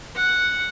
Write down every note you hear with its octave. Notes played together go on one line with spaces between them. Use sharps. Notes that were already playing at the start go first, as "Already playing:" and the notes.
F#5